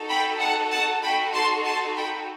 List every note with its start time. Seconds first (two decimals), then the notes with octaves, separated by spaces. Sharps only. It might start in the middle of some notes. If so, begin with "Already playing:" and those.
Already playing: D#4 F#4 A4
0.09 G5 B5
0.40 F#5 A5
0.71 F#5 A5
1.02 D#4 F#4 A4 G5 B5
1.34 A5 C6
1.65 A5 C6
1.96 G5 B5